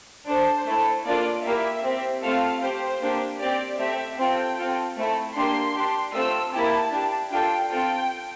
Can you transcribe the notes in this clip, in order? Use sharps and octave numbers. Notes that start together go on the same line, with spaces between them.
D4 A4 C5
A3 E4 A4
A#3 D4 F4 A4 D5
A#3 E4 G4 E5
C4 G4
A3 C4 F4 A4 F5
C4 G4 C5
A#3 D4 G4
C4 G4 D5
A3 C4 G4 E5
C4 F4 A4 G5
C4 F4 A4
A3 C4 E4 A4
A#3 D4 G4 C6
D4 G4
A3 C4 F4 A4 E6
A#3 E4 G4 A5
D4 G4
D4 F4 A4 G5
C4 F4 A4 G5